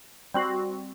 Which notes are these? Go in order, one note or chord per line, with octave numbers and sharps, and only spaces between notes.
G3 C4 F#4